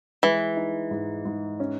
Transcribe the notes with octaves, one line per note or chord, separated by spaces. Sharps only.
E3 G#3
D#4
G#2
G#2
C#4